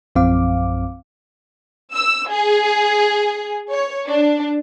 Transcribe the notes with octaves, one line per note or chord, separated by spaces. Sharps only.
A#1 F#2 F3 C4 F5 D6
E6
G#4
C#5
D4